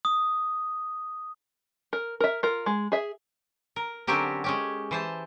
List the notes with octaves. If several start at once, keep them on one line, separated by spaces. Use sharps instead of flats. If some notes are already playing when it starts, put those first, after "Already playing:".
D#6
A#4
A#4 E5
F4 A#4
G#3
G#4 E5
A#4
D3 F#3 C4 C#4 G4 A#4
G#3 C#4 G4
E3 C5 A5